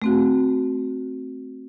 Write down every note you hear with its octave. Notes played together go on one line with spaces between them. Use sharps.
A3 C4 F#4